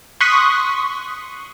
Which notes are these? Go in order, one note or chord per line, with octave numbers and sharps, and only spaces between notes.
C6 C#6 D#6 F#6 B6